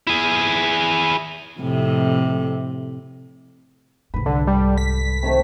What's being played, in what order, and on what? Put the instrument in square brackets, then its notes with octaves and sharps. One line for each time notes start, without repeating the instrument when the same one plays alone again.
[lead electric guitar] E4 G#4
[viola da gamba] F2 A2 C3
[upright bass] C2 G#2 [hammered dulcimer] B4
[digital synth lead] D3 [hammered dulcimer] A4
[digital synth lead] G3
B6
[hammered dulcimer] C3 D#3 A3